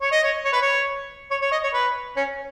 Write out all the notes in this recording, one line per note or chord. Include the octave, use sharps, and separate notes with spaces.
C#5
D#5
C#5
C#5
B4
C#5
C#5
C#5
D#5
C#5
B4
C#4